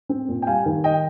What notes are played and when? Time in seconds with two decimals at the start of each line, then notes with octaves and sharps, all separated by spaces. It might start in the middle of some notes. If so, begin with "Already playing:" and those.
0.09 C4
0.28 A#2
0.42 G5
0.47 G3 F5 G#5
0.66 D#3
0.84 D#5 G5